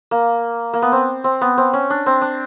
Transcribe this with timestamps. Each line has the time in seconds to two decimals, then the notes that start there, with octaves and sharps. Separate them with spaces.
0.11 A#3
0.74 A#3
0.82 B3
0.92 C4
1.24 C4
1.41 B3
1.58 C4
1.73 C#4
1.90 D4
2.06 C4
2.22 D4